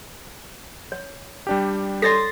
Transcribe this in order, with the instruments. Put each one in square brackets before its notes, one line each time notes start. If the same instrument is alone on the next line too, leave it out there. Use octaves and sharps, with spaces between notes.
[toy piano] C#5
[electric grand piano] G3 D4 G4
[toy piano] A4 C#5 D5 [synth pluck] C6 A6 A#6